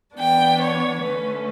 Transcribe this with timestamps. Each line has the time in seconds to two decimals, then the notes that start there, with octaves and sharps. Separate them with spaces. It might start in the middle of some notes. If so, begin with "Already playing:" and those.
0.18 E3 B3 D4 G5
0.60 C#5
1.03 D3 A3 C#4 B4